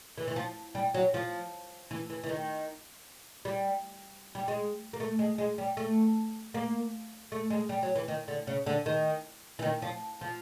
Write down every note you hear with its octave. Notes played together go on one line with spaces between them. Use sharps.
E3
E3
F3
G3
F#3
F3
E3
E3
E3
D#3
G3
G3
G#3
A#3
A3
G#3
G#3
G3
A3
A#3
A3
G#3
G3
F#3
E3
D#3
D3
C#3
D3
D#3
E3
D#3
F3
F3